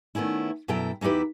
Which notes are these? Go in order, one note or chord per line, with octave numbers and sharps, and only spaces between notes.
D#3 A3 B3 C#4 E4
F#2 B2 E4 A4 G5 A#5
E2 D#4 E4 G4 B4